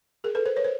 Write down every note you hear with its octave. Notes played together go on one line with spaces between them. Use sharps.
G#4 A#4
A4 B4
A#4 C5
B4 C#5
A#4 C5